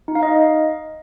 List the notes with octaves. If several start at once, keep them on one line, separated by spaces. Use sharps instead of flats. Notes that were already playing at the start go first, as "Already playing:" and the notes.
D#4
F5
D#5